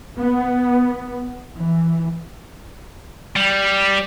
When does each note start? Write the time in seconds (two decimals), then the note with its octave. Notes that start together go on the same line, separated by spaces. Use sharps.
0.17 B3
1.57 E3
3.36 G3